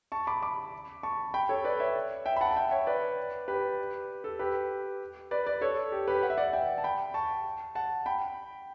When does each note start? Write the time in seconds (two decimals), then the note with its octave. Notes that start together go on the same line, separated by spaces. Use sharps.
0.12 A5 C#6
0.27 B5 D6
0.42 B5 D6
1.03 A5 C#6
1.34 G5 B5
1.49 A4 C#5
1.64 B4 D5
1.80 C#5 E5
2.26 E5 G5
2.36 B5
2.41 F#5 A5
2.51 A5
2.56 E5 G5
2.71 C#5 E5
2.87 B4 D5
3.48 G4 B4
4.24 A4
4.39 G4 B4
5.31 B4 D5
5.46 B4 D5
5.61 A4 C#5
5.92 G4
6.07 G4 B4
6.23 F#5
6.30 E5
6.38 D5 F#5
6.53 E5 G5
6.78 A5
6.84 G5 B5
7.14 A5 C#6
7.75 F#5 A5
8.06 G5 B5